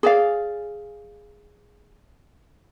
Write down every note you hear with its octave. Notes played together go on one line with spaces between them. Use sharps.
G#4 D5 F5